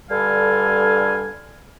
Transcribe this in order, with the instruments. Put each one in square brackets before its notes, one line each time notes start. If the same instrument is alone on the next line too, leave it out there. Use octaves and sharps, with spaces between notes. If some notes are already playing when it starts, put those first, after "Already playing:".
[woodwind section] G2 D3 G3 A4 F5 G#5